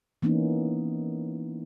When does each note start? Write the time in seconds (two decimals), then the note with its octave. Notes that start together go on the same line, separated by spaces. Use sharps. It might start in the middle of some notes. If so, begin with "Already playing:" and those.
0.22 E3 A#3 B3 C#4 D#4